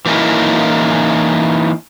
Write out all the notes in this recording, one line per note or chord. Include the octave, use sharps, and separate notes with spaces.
E3 A#3 C#4 D#4 E4